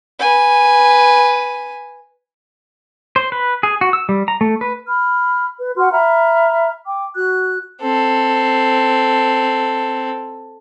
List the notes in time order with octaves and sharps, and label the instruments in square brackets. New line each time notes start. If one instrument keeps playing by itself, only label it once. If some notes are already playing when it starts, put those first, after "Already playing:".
[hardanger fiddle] B4 G#5
[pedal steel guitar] C5
B4
G#4
F#4
E6
G3
A#5
A3
B4
[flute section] B5 F6
B4
F#4 F#5 C6 F6
E5 A#5 B5 F6
G5 D6
F#4 F#6
[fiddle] C4 A4